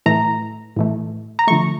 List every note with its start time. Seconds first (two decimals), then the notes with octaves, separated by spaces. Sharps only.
0.06 A2 E3 A3 A#5
0.77 A2 E3 A3
1.39 A#5
1.48 D3 F3 A3 C#6